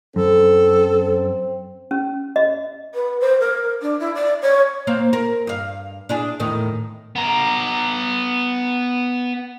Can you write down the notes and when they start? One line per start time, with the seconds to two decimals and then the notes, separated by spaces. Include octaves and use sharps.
0.16 F#2 C4 A4
1.91 C#4
2.36 D#5
2.94 B4
3.20 C5
3.39 A#4
3.81 D4
3.99 E4
4.14 D5
4.41 C#5
4.87 A#3 C4 F5
5.13 A#4
5.47 G2 F5
6.09 D4 E4 G#4
6.40 E2 A2 D#3
7.16 B3 A#5